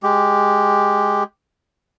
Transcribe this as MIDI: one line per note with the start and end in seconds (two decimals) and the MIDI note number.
0.03 1.23 56
0.03 1.23 67